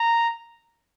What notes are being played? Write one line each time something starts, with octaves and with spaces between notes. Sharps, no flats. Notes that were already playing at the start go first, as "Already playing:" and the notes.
Already playing: A#5